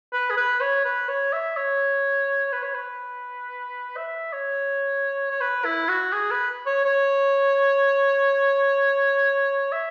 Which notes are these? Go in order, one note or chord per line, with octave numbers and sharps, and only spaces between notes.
B4
G#4
B4
C#5
B4
C#5
E5
C#5
B4
C#5
B4
E5
C#5
C#5
B4
E4
F#4
G#4
B4
C#5
C#5
E5